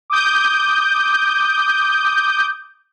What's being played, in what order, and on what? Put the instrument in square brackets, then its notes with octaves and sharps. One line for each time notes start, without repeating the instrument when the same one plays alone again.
[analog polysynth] D6 D#6 G6